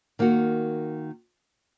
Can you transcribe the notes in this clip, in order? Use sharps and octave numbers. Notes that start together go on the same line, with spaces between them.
D#3 A#3 F#4